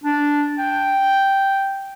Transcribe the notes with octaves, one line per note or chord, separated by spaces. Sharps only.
D4
G5